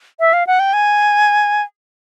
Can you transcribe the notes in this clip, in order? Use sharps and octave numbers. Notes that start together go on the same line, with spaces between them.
E5
F5
F#5
G5
G#5